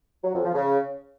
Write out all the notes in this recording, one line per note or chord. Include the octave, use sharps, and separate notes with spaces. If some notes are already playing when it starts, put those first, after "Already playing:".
F#3
F2
F3
C#3